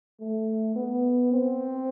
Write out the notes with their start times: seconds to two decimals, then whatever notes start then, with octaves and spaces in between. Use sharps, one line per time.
0.20 A3
0.75 B3
1.32 C4